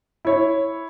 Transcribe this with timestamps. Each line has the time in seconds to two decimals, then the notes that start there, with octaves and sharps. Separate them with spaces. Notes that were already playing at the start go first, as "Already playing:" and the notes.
0.25 E4 C#5